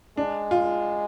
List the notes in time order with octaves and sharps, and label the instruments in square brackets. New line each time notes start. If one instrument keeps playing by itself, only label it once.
[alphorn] G#3 [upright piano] D4
[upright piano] F4